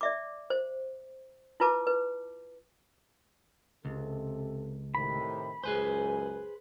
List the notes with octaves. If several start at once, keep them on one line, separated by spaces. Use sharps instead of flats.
D5 E5 D6
C5
E4 F4 B4 A5 D6
B4
C#2 C3 A4
A2 C3 D#3 B5
C#2 F#2 G#4 B4 C5 G#5